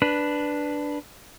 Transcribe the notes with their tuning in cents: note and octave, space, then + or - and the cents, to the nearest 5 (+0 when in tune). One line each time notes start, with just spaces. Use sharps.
D4 +0 B4 +0